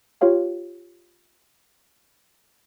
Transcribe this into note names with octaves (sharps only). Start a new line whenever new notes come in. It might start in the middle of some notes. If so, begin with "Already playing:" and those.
F4 G4 C#5 F5 G5